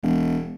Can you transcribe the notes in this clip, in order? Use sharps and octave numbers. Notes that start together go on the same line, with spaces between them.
E1